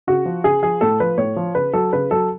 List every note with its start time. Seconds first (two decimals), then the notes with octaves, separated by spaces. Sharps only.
0.07 C#3 F#4
0.26 F3
0.44 C#3 G#4
0.62 F3 G#4
0.81 A2 A4
1.00 F3 B4
1.18 A2 C#5
1.36 F3
1.55 C#3 B4
1.73 F#3 A4
1.93 C#3 B4
2.11 F#3 A4